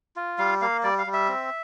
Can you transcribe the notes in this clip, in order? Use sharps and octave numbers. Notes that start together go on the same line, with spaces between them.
F4
G3 F5
A#3 F5
G3 D5
F5
G3
E5
C4